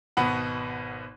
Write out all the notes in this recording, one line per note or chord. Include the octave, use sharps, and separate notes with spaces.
G#1 B2 B3 F#5 B5